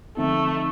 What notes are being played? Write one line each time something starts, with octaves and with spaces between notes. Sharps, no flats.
D3 F3 A3 C4 D#4
D#4